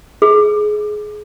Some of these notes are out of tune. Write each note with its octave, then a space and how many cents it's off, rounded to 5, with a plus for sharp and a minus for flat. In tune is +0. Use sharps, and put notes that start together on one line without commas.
G#4 +20